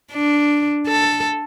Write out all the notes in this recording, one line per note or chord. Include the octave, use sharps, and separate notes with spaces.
D4
A4